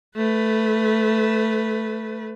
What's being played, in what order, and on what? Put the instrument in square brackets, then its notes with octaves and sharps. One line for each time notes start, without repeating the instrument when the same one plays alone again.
[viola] A3 B4